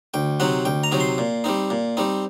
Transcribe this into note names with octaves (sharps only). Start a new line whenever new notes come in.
D2 G5
C3 F#3 C4 D#4 F#5
D2 G5
A#5
C3 F#3 C4 D#4
C6
A#2
G3 C4 D#4
A#2
G3 C4 D#4